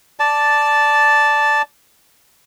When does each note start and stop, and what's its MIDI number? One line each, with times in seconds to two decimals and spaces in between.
0.20 1.62 74
0.20 1.62 81